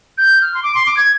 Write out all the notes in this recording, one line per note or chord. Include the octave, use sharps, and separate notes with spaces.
G6
F6
C6
D6
C6
D6
G#6